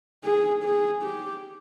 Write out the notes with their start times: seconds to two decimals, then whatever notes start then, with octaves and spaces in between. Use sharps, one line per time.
0.24 G#4
0.63 G#4
1.03 G4